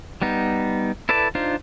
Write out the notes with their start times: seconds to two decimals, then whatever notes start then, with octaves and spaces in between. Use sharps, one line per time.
0.22 G3 B3 D#4
1.09 E4 A4 B4 D5 A5
1.35 D4 D#4 F4 C5